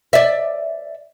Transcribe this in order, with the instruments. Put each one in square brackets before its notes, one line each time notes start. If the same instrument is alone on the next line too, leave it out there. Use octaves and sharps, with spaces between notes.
[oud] D5 E5